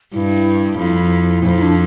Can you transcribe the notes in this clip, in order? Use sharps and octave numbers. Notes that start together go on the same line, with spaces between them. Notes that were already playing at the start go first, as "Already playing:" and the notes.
G2 E4
F2
F2 E4
E4
D4